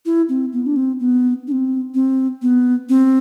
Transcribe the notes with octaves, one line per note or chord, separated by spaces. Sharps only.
E4
C4
B3
D4
C4
B3
D4
C4
C4
B3
C4